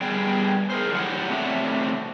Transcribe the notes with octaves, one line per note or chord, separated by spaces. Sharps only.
G3 B3 G#4 G5
G#4 A#4 C5
A2 D3 F#3 D4 G4 F#5
C3 A3 F#4 C#5 D5 E5